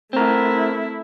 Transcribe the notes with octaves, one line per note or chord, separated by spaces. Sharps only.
A3 C4 E4 A#4